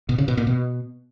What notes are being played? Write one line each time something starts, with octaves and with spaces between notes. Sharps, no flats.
B2
C#3
B2
A#2
B2